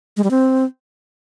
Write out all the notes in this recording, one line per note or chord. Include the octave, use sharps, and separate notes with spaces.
G#3
G3
C4